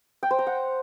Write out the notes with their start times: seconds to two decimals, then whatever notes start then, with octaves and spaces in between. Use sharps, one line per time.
0.23 G5
0.31 C5
0.39 A#5
0.47 F#5